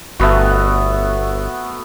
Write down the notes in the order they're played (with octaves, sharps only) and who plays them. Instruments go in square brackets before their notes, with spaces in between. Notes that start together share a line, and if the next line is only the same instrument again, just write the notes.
[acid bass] G1 [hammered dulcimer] A3 B3 F#4